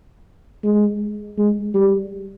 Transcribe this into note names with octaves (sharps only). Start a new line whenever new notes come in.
G#3
G#3
G3